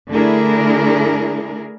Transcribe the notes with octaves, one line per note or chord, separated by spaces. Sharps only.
D3 A3 D4 E4 G#4 A#4